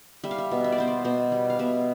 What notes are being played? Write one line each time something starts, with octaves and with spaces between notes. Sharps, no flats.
G3 E5
F5
E5
B2
E5
D5
B3 C5
D5
B2 C5
G3
F5
B2 E5